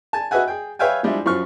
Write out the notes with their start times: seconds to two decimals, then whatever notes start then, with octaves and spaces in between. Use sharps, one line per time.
0.13 G#5 A5
0.31 F#4 B4 D#5 E5 F#5 G#5
0.48 G#4 G5
0.79 B4 C#5 E5 F5 G5 G#5
1.03 F3 G3 G#3 D4 E4
1.26 F#2 F3 C#6 F6